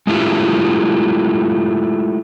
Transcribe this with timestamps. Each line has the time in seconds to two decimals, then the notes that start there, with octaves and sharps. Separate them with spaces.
0.07 G#3 A3 E4 F4 G4